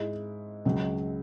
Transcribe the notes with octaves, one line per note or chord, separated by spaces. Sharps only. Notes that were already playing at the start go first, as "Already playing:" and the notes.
Already playing: G#2 G#3 E4
C#2 C#3 F#3